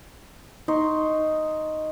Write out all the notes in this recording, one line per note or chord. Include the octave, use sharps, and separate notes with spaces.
D#4 D#5 C6 C#6